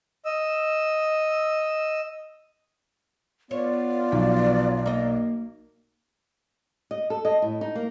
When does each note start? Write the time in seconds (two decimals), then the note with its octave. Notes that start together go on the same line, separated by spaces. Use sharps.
0.25 D#5 E6
3.51 B3 F4 C#5 D5
4.12 B1 F3
4.86 A#3 D#5
6.91 D#5
7.10 A4
7.25 D#5
7.42 A2
7.61 D#4
7.75 A#3